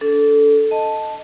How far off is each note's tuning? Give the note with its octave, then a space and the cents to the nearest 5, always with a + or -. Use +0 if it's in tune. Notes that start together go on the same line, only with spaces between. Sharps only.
D4 -25 A4 +0
D#5 +0 A5 +0